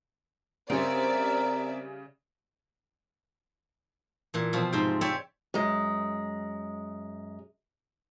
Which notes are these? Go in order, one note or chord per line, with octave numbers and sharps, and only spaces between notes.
C#3 G3 C4 C#4 A#4 C#5 D5 E5
A#2 E3
B2 F3 C4
G#2 C3 C5 G5
C4 G4 C#5 D5 E5
F#2 G#3